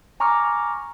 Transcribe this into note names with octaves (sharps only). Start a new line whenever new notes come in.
G#5 A#5 C#6 D6 F6